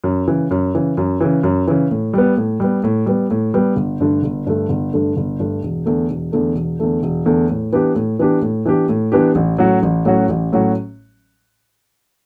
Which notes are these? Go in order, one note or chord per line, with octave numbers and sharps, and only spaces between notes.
F#2
C#3 E3
F#2
C#3 E3
F#2
C#3 E3
F#2
C#3 E3
A2
G3 B3
A2
G3 B3
A2
G3 B3
A2
G3 B3
G1
G2 D3 A3
G1
G2 D3 A3
G1
G2 D3 A3
G1
G2 D3 A3
E1
E2 D3 A3
E1
E2 D3 A3
E1
E2 D3 A3
E1
E2 D3 A3
A2
E3 B3 D4 G4
A2
E3 B3 D4 G4
A2
E3 B3 D4 G4
A2
E3 B3 D4 G4
A1
A2 F#3 C#4 F#4
A1
A2 F#3 C#4 F#4
A1
A2 F#3 C#4 F#4